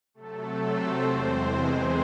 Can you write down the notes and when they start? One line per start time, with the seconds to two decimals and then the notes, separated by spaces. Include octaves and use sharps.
0.14 C3 F#3 A3 A4
0.59 C4 C5
1.03 E2 C3 E3 G#3
1.47 G#3 G#4